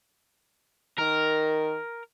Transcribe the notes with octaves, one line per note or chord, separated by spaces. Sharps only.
D#3 A#4